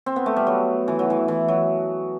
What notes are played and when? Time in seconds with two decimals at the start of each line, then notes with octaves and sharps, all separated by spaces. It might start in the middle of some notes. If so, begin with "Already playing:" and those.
0.06 C4
0.16 B3
0.26 A3
0.36 G3
0.47 F#3
0.88 E3
0.99 F#3
1.10 E3
1.28 E3
1.48 F#3